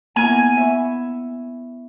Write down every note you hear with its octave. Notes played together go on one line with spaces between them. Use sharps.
A#3 B3 E4 G#5
E5 B5 C#6